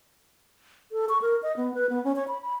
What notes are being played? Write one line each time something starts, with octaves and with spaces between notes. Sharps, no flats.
A4
C#6
A#4
D#5
B3
B4
B3
C#4
C#5
B5
B5